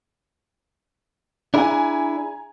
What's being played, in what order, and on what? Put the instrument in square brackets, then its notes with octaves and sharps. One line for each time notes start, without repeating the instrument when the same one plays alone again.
[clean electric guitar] D4 E4 G#4 [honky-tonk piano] G#5 A#5